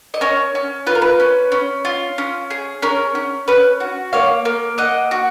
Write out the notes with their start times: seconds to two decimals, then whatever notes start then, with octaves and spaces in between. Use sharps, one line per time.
0.14 D#5
0.21 C#4 A#4 C#5
0.55 C#4
0.87 F4 B4
0.95 A#4
1.02 B4
1.20 C#4
1.52 C#4
1.85 F4
2.18 C#4
2.50 G#4
2.82 C#4 A#4
3.15 C#4
3.48 C#4 B4
3.80 F#4
4.13 A#3 C#5 F5
4.45 A#3
4.78 A#3 D#5 F#5
5.11 F#4